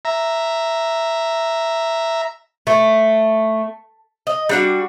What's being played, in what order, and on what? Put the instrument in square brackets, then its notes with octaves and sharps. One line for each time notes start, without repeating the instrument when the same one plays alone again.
[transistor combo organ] E5 A#5
[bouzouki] A3
D#5
G3 D4 F#4